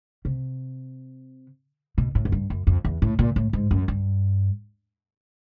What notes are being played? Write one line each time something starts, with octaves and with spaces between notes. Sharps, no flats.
C3
B2
A2
F#2
G2
F#2
F2
E2
A2
A#2
A2
G#2
F#2
G2